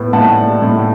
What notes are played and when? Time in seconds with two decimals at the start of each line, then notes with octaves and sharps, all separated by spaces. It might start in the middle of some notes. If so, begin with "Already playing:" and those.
Already playing: A2 B3
0.13 A2 F#5 A5
0.37 G3
0.62 A2